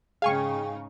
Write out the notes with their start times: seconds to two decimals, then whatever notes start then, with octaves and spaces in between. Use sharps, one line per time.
0.22 G#2 C#3 D#4 G#4 F5 G5 G#5 C#6